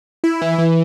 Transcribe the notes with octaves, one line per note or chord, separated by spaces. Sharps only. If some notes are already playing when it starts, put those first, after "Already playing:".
E4
E3
E3